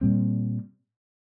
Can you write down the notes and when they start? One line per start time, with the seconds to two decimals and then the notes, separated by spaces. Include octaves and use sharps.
0.01 A#2 G3 C4